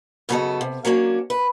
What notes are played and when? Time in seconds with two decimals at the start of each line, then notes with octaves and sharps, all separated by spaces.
0.29 F#2 C#3 B3 G#4 A4 D#5
0.61 C3
0.85 F#3 A#3 C#4 D4
1.30 B4